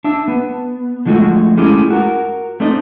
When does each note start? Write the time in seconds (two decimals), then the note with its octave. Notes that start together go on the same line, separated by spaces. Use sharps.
0.04 D4 E5
0.28 B3
1.06 D3 F3 G#3 A3 F#4 A4
1.57 G#3 A3 C#4 E4 G4 G#4
1.90 F#4 A#4
2.60 A3 C4 D4 D#4 D#5